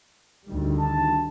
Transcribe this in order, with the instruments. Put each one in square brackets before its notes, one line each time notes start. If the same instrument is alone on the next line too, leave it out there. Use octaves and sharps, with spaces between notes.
[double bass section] D2 D#3 G3
[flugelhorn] A5